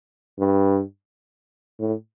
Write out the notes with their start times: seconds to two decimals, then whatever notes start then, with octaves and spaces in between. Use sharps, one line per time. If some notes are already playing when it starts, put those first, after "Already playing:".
0.39 G2
1.79 A2